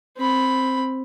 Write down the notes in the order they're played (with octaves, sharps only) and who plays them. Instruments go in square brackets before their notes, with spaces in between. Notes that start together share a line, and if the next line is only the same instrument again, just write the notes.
[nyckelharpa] C4 B5